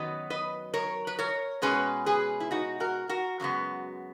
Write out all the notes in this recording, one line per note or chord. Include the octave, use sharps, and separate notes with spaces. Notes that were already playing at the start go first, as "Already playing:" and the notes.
Already playing: F#2 D#3 F#3 B3 B4 D#5
B4 D#5
A#4 C#5
B4
A#4 C#5
B2 G#3 C#4 G#4 B4
G#4 B4
E4
D#4 F#4
F#4 A#4
F#4 A#4
F#2 C#3 G#3 B3